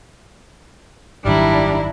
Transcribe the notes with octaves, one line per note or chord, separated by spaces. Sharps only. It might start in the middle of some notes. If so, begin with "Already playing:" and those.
G#1 F#2 D#3 G3 D4 E4 A#5